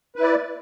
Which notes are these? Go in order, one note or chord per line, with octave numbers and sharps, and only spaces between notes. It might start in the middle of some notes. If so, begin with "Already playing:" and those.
E4 B4 D5